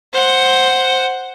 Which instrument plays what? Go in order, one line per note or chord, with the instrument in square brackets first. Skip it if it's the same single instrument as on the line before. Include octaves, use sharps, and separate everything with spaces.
[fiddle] C5 F#5